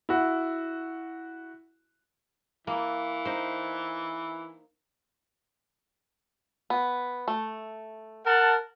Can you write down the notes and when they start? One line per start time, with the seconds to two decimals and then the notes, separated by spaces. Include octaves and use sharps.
0.09 E4 F#4
2.67 E3 A#3
3.25 D#4 C5
6.70 B3
7.28 A3
8.27 A#4 F#5 A5